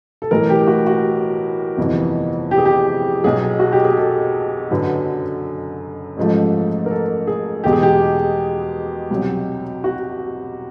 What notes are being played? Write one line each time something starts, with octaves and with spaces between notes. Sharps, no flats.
A4
B1 A2 E3 A#4
G4
F#4
F#4
G1 F2 C3 E3
G4
G#4
G4
B1 B2 F#3 G#4
F#4
G4
G#4
A4
F#1 F#2 D3 F#3 B4
A1 G#2 F3 A3
A#4
A4
G#4
E2 B2 G#3 G4
G#4
G4
C2 B2 F#3
F#4